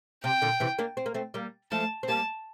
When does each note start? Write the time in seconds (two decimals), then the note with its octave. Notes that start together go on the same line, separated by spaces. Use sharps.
0.24 C3 G5
0.42 A#2 D3
0.60 C3 E3
0.79 A#3 D4
0.97 C4
1.06 A#3
1.14 A3 C4
1.34 G3 A#3
1.71 F3 A3 A5
2.03 C4
2.08 G3 A#3 A5